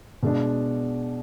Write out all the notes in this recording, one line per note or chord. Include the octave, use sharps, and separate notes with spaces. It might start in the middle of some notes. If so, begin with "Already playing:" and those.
B2 G#3 D4